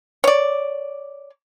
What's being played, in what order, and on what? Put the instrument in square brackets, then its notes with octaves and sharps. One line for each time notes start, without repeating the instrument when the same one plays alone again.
[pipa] C#5 D5